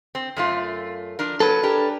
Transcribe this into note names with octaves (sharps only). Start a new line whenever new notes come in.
C4
F#2 A3 F4
F3 D4 A#4
F#3 A4 B4
D4 G4 A#4